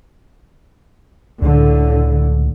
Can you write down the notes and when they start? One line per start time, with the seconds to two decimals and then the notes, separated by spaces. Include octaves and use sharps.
1.42 C#2 A2 D3